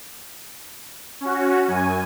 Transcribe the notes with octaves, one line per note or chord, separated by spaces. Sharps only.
C#4 F#4
F#2 G#5